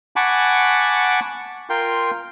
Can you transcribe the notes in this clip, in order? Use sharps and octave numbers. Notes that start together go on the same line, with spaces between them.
F#5 G#5 A5 B5 C#6 D6
F4 A#4 G5 C6